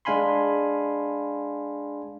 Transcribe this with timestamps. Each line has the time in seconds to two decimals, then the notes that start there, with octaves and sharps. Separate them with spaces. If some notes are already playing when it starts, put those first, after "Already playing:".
0.05 G#3 D4 F5 G#5 B5 C6